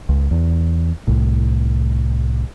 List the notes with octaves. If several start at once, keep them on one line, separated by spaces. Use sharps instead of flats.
C#2
E2
C2 A2